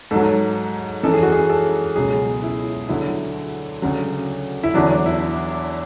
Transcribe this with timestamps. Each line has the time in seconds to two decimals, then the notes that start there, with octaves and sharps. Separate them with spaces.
0.11 G#2 F#3 A4
1.03 F#2 E3 A4
1.14 G#4
1.23 F#4
1.32 G#4
1.50 A4
1.96 C#2 B2 F#3 G#4
2.43 E4
2.88 D2 D3 F#3 E4
3.82 D2 C#3 F#3
4.63 E4
4.74 E2 D3 F#3 D4
5.06 E4